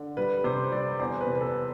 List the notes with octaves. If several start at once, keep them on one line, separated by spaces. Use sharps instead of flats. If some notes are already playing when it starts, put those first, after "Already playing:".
Already playing: D3
G3 B4
C3 C5
G3 D5
E2 C5
B4
C3
B4
A4